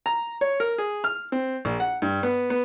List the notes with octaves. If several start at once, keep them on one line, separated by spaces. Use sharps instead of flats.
A#5
C#5
A#4
G#4
F6
C4
A#1
F#5
G2
B3
B3